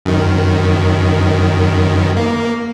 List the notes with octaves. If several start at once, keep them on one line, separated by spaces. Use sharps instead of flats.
F#2 D#3
A#3